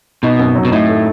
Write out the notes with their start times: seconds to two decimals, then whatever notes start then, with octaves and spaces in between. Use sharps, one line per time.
0.23 B2 D#4
0.39 F#2
0.55 F#3
0.65 B2
0.72 A2 D#4
0.89 A3